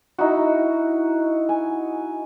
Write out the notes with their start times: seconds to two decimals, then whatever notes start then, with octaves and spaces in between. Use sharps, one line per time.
0.18 D#4 E4 F#4
1.49 G#5